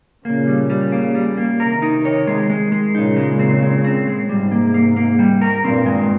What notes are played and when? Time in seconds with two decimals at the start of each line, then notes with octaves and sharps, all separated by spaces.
0.25 A#2 C#3 A#3
0.47 G3
0.70 G3
0.92 A#3
1.15 G3
1.37 A#3
1.60 C3 D#3 A#4
1.82 D#4
2.05 C#5
2.27 G#3
2.50 G#3
2.72 G#3
2.94 A#2 C#3 D#4
3.16 G#3
3.39 C4
3.62 G#3
3.84 C4
4.07 G#3
4.29 G#2 C3 G3
4.52 A#3
4.74 A#3
4.96 A#3
5.19 G3
5.42 A#4
5.63 G2 A#2 C4
5.86 G#3